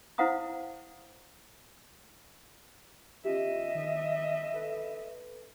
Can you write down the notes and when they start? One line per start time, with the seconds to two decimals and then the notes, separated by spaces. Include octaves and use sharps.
0.18 E4 C5 F5 F#5 A#5 D#6
3.25 C#4 F4 G4 D#5 E5
3.75 D#3
4.54 A4 B4